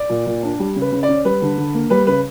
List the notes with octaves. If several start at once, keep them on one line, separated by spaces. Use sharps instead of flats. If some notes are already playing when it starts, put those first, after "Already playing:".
Already playing: D5
A#2
A#2
D4
G3
C#3
B4
C#3
D5
C#4
G3 B4
D3
D3
A#3
G3 B4
C#3 B4